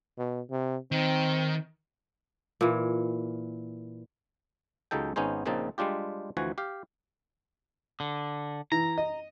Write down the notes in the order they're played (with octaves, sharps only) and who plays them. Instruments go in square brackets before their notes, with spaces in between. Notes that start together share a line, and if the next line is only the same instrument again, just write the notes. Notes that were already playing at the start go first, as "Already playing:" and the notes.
[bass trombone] B2
C3
[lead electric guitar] D#3 [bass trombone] C4
[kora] A#2 E3
[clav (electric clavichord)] C#2 C#3 F#3 D#4 A4 G5
G#1 B3 C#4 D#4 G#4 C5
A#1 A#2 C#3 C4 D#4 A5
G3 G#3 D4 F4 G4
D2 E3 F3 F#4 G#5
G4 F5
[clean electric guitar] D3
[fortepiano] E3 [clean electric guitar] A#5
[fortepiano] D#5